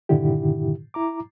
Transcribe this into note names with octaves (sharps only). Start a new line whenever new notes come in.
G2 A#2 D3 D#3 E4 G4
E4 A#5 D6